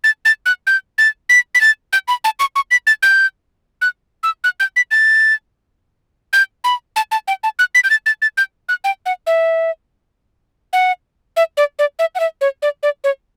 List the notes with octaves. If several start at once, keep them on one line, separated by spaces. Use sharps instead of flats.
A6
A6
F#6
G6
A6
B6
B6
A6
G6
B5
A5
C#6
C#6
B6
A6
G6
F#6
E6
F#6
G6
B6
A6
G6
B5
A5
A5
G5
A5
F#6
B6
G6
A6
A6
A6
G6
F#6
G5
F#5
E5
F#5
E5
D5
D5
E5
F#5
E5
C#5
D5
D5
C#5